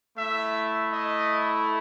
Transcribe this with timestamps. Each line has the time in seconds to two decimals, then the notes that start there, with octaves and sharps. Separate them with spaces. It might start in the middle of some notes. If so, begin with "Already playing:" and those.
0.16 A3 E4 E5
0.89 D#5